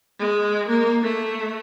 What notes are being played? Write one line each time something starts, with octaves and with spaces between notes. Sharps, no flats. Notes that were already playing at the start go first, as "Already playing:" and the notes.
G#3
A#3
A3